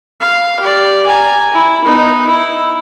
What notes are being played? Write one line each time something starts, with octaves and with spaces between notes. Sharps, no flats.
F5
G4 D5
G#5 A#5
E4
B3 D#4
E4